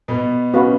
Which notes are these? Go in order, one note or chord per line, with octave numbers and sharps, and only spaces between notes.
B2 B3
C#4 F#4 B4 F5